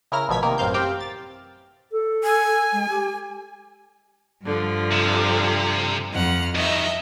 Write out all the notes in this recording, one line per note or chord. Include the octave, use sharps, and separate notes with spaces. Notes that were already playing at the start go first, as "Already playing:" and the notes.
C#3 E4 A#4 F6 A#6
A1 B2 F3 G#6 B6
C3 D#3 A#3 A#4
A1 F#2 C4 F5 G6
C4 G4 F5 G5
A6
A4
G#5
G#3
G4
G2 D3 F3
C3
F2 F#5 F6
G2 D#3 D#5 E5